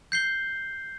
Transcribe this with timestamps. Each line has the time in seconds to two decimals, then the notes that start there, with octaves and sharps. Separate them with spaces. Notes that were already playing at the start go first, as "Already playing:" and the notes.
0.12 G6 C7 G7